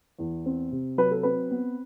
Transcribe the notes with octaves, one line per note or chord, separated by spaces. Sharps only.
E2
C4
C3
F#3 B4
A4
C4 B4
B3